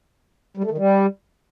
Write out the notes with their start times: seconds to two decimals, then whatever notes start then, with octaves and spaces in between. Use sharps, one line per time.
0.57 G3
0.64 A3
0.71 D#3
0.78 G3